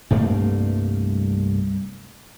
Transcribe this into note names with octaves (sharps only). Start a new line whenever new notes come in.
C2 G2 A3 A#3